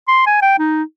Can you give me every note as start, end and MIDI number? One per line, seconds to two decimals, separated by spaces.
0.08 0.25 84
0.26 0.39 80
0.42 0.58 79
0.59 0.83 63